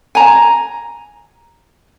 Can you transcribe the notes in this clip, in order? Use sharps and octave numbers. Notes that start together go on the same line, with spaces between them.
G#5 A#5